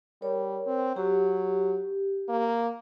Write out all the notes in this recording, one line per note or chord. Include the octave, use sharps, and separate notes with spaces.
G3 A#4 C#5
C4
F#3 G4
A#3